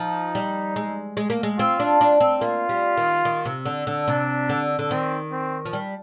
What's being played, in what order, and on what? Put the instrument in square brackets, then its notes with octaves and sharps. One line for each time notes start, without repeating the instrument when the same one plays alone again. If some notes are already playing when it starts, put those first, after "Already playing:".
Already playing: [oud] F3 [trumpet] D#4
[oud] G3
G#3
G#3
A#3
G#3
[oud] C4 [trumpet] F4
[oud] D4
D4
C4
[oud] A#3 [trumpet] F4
[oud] G3
D#3
D#3
C3
D3
D3
[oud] C3 [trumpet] D4
[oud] D3
D3
[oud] D#3 [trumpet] C4
[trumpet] C4
[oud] F3
G3